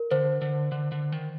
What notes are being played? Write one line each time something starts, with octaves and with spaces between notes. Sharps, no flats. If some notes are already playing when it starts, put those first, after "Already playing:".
Already playing: A#4
D3 C5
D3
D3
D3
D#3